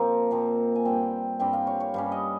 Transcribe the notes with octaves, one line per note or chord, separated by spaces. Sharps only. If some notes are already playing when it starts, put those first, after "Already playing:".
Already playing: A#2 F3 C4 A#5
A#2 F3 C4
G#5
G2 G3 C4 G5
G2 G3 C4 G5
F5
C#5
C#5
G2 G3 C#4 F5
D#5